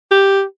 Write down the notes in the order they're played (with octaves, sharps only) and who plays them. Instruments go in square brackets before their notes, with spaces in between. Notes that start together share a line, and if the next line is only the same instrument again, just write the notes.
[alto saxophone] G4